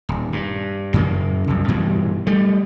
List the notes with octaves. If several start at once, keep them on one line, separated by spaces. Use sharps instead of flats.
D#1
G2
F#2 C#3 A#3
C2 F#2
G2 B2 E3 G3
G3 A3